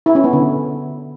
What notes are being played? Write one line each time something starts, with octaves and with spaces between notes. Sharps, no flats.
E4
C#4
B3
D3